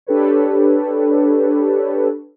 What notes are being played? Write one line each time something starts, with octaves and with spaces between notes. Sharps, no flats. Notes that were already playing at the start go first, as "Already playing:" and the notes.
D4 G4 A4 B4 C#5